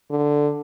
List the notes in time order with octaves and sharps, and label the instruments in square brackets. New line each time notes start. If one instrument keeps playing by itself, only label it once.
[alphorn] D3